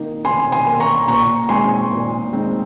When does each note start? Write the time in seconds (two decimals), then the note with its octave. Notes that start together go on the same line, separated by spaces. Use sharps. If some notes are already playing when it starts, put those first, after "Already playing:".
Already playing: C3 D#3 A#3 D#4
0.24 C3 G#5 C6
0.52 G#5 C6
0.66 D#3 A#3 D#4
0.80 A#5 C#6
1.08 A#2 A#5 C#6
1.49 G#3 C4 D#4 G#5 C6
1.92 A#2
2.33 G#3 C4 D#4